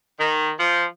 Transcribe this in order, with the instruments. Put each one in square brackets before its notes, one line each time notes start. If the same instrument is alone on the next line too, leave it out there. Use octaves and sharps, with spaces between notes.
[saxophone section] D#3
F3